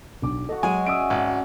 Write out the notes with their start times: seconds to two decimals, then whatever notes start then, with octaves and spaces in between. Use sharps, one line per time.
0.22 B1 D4 D6
0.49 F#4 A4 D#5
0.63 F#3 G#3 G#5
0.87 C#4 D5 E5 D#6 E6 D7
1.10 G#1